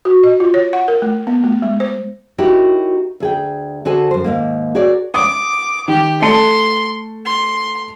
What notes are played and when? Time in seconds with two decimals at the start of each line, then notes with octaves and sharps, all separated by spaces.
0.05 F#4
0.23 D#5
0.40 F4
0.54 C#5
0.73 F#5
0.88 A#4
1.02 A3
1.27 B3
1.44 A3
1.62 G#3
1.80 C5
2.38 D#4 E4 F#4 G4 A#4 C#5
3.20 D2 G#4 G5
3.85 D3 F#4 G#4 A4 C5 G#5
4.11 F#2 C5
4.24 D#2 G#2 A#3
4.75 F#4 G#4 A#4 C#5 D5
5.14 D6 D#6
5.88 D#3 G4
6.22 A3 A5 C6 C#7
7.25 C6